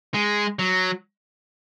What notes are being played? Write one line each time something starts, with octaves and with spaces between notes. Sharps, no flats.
G#3
F#3